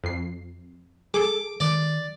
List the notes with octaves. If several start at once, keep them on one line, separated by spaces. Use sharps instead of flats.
F2 C7
G#4 A4 D6
D#3 D5